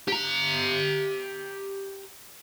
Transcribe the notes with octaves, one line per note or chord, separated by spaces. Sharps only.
G4 A#5